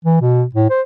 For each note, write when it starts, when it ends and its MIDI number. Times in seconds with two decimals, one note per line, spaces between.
0.05 0.17 52
0.21 0.44 47
0.55 0.68 45
0.70 0.82 72